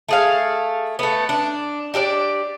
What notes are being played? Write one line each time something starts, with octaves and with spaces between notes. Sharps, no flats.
A3 G#4 F5
A3 B3
D4
D4 G4 A4 D5